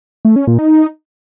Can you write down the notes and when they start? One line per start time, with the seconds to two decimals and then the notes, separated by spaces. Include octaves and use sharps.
0.25 A3
0.36 C#4
0.47 A#2
0.59 D#4